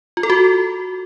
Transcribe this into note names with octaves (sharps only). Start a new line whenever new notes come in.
F4
A4
F#4